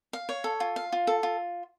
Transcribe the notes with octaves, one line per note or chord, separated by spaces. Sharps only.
F5
C#5
A4
F4
F5
F4
A4
F4